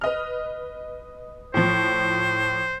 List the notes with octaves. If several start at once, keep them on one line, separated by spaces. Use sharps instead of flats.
B4 D#5 F6
A2 F3 C5